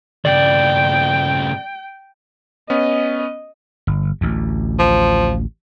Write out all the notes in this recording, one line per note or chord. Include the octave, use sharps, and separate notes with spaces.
G2 C#3 D5 G5
B3 C#4 D#5
G1
A1 D2
F3